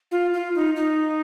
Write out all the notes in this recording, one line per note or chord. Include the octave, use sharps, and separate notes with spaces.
F4
F4
D#4
D#4